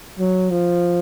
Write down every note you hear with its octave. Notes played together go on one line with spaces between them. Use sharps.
F#3
F3